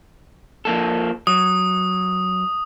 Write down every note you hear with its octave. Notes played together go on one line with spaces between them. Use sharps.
F3 A#3 A4
F#3 D#6